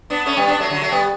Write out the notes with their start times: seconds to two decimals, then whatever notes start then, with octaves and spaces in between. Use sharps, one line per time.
0.10 B3 D4
0.26 A3 C#4
0.37 G3 B3
0.48 B3 D4
0.60 F#3 A3
0.70 D3 F#3
0.82 F#3 A3
0.92 G3 B3